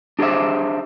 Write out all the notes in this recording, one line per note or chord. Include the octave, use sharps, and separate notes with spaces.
D4 G4 G#4 C5 E5